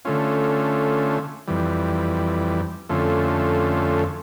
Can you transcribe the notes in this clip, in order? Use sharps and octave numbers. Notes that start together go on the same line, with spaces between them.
D3 A3 C#4 F4
F2 E3 G3
F2 D3 A3 C#4 F4